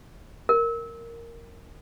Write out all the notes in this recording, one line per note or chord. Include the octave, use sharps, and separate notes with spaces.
A#4